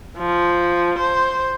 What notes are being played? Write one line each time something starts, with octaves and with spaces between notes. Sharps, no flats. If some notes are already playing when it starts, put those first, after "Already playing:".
F3
C5